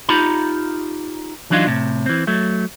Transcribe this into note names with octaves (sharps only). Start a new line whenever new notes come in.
D#4 F4 G4 A#5 B5
E3 F#3 D4 D#4 F4
A2 C3
E3 C4
F#3 A3